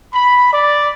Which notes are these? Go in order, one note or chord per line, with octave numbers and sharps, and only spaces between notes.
B5
D5